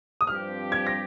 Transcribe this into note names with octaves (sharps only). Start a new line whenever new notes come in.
D#6
G2 F3 C4 G4 F6
G#6
A#6